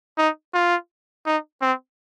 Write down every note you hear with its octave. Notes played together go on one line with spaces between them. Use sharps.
D#4
F4
D#4
C4